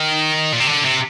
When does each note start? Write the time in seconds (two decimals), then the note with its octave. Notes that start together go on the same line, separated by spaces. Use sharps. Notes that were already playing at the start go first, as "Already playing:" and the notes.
Already playing: D#3
0.52 A#2
0.60 C3
0.67 D3
0.85 C3